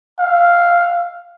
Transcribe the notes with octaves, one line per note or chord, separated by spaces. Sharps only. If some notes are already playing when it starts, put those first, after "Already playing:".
F5